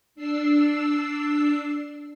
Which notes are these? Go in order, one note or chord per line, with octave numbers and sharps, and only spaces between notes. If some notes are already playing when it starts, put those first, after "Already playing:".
D4 E6 C7